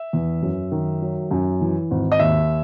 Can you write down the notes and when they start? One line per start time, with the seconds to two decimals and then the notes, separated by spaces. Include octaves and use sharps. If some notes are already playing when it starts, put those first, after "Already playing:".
Already playing: E5
0.13 E2
0.42 F#2
0.72 D#3
1.02 F#3
1.31 F#2
1.61 E3
1.91 G#1
2.12 D#5
2.19 D#2 E5